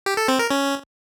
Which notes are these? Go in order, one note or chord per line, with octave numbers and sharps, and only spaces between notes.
G4
A4
C4
A#4
C#4